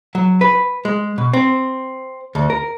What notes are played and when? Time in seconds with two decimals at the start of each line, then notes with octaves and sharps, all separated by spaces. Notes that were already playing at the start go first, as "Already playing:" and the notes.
0.15 F#3
0.41 B4
0.85 G#3
1.18 B2
1.33 C4
2.35 D2
2.50 A#4